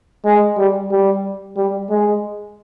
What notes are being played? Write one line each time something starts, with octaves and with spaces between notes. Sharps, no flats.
G#3
G3
G3
G3
G#3